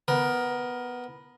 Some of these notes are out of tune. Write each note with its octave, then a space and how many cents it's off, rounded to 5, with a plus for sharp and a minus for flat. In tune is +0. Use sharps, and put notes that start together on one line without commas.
B3 +0 A#4 +15